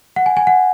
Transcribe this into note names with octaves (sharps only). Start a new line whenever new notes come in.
F#5
G#5
G#5
F#5